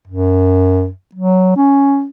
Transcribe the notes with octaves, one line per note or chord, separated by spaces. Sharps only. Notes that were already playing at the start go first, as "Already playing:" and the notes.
F#2
F#3
C#4